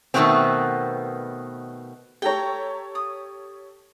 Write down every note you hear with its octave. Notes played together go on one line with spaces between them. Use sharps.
B2 D#3 F3 A3 B3 C4
G4 A4 C#5 G5 A#5
D#6